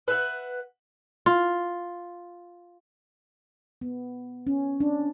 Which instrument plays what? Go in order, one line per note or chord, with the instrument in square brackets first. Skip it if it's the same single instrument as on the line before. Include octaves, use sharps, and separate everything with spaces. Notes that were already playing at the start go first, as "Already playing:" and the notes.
[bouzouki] B4 E5 F#5
[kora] F4
[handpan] B3
C#4
D4